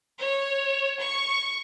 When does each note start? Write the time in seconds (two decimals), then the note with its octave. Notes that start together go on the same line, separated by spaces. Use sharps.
0.18 C#5
0.99 C#6